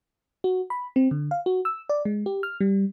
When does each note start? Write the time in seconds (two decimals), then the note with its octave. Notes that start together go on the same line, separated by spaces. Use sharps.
0.44 F#4
0.70 B5
0.96 C4
1.11 D3
1.31 F5
1.46 F#4
1.65 E6
1.89 D5
2.05 G#3
2.26 G4
2.43 F6
2.61 G3